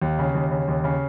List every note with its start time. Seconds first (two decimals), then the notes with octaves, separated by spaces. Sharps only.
0.02 D#2
0.19 C#3
0.34 D#2
0.51 C#3
0.68 D#2
0.84 C#3